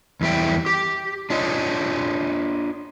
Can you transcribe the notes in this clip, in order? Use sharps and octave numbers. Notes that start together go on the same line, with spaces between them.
E2 G3 E4 G5
G4
D4 F4 C#5 D#5